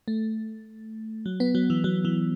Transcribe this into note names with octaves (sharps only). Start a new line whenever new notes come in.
A3
F#3
B3
F#3
E3
F#3
E3